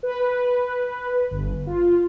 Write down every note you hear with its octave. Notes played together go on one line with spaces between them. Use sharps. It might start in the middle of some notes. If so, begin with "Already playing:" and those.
B4
G1
F4